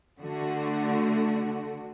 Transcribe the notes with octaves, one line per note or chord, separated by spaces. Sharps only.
D3 A3 F#4